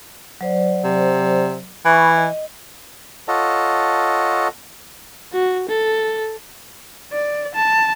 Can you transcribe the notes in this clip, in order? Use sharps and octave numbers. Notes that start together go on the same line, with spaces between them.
F#3 C5 D5
C3
E3 E5 B5 C#6
D#5
F4 A4 C#5 D#5 F#5 A5
F#4
A4
D5
A5